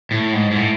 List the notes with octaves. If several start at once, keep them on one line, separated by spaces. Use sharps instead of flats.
A2
G#2
G#2
A2